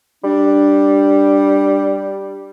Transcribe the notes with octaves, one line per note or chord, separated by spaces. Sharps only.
G3 D4